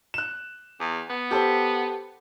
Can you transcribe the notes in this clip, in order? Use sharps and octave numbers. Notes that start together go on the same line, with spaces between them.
F#6 E7
E2
B3
G4 A4 C5